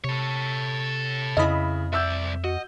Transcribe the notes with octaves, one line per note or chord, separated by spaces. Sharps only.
C3 A4 C#5
F2 C#3 E4 D#5 B5
C2 D5 E5 E6 G6
F#4 D#5